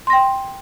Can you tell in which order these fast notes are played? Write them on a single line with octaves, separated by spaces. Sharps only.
C6 A#6 G5